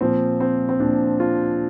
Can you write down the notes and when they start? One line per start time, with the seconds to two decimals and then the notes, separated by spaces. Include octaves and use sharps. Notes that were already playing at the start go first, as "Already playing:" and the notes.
0.01 A#2 F3 C4
0.40 C4
0.69 C4
0.80 A#2 F3 D4
1.20 F4